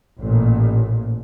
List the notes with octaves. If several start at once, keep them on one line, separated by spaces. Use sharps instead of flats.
A1 A#2